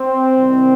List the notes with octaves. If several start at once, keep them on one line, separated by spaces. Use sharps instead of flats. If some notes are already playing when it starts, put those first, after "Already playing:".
Already playing: C4
C2 C3 D#3 G3